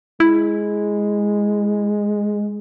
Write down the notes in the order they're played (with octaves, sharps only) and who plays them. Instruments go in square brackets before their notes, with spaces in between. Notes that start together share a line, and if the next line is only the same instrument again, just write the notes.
[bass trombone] G#3 [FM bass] E4